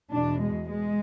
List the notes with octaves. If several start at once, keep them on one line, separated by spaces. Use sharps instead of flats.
E2 B2 D4
G#3
G#3